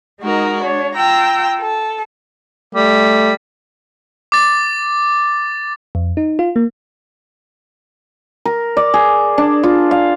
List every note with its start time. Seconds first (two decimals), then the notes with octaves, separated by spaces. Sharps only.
0.20 G#3 D#4 F#4 A#4
0.61 D4 C#5
0.93 F4 G5 A#5 E6
1.60 A4
2.75 G3 A3
4.32 D6 A6
5.95 F2
6.17 D#4
6.39 F4
6.56 A#3
8.45 A#4
8.77 D5
8.94 G#4
9.38 D4
9.63 F4
9.91 F5